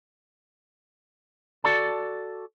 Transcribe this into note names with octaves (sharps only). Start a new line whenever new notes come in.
F#4 A4 D5 A5